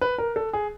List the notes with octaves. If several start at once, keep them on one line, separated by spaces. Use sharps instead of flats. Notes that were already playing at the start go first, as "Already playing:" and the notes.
B4
A#4
A4
G#4